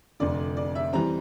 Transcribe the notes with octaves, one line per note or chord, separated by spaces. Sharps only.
F1 F2 D3 D5
D5
E5
E3 G3 C4 A#5